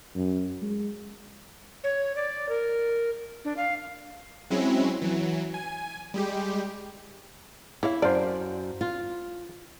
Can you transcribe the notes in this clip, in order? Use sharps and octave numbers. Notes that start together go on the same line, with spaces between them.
F#2
G#3
C#5
D5
A#4
D4
F5
F#3 G#3 C4 C#4 E4
E3 F#3
G#5
G3 G#3 G4
E3 E4 C#5 F5
F#2 C5 D5 F5 A5
F4